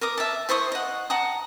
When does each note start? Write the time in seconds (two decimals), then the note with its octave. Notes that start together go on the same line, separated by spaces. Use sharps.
0.01 A#4 D6 D#6
0.17 E5 A5
0.49 E4 C5 C#6 D#6
0.72 D#5 F#5
1.10 F#5 A5 A#5 D#6